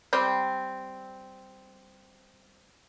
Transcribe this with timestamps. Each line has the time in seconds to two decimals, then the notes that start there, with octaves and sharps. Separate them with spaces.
0.13 G3 C4